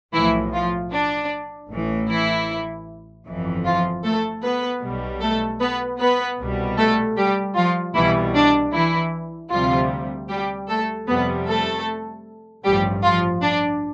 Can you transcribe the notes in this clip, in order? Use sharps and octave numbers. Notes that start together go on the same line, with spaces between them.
B1 A2 E3 F3 E4
F3 F4
D4
A1 A2 E3
E3 E4
G1 F2 E3
F3 F4
A3 A4
B3 B4
B1 B2 G3
A3 A4
B3 B4
B3 B4
C2 B2 G3
A3 A4
G3 G4
F3 F4
C2 B2 E3 G3 E4
D4
E3 E4
D2 C3 F3 G3 F4
G3 G4
A3 A4
F2 C3 G3 B3 B4
A3 A4
A1 G2 F3 G3 G4
F3 F4
D4